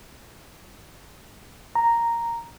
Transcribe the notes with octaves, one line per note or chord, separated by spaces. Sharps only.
A#5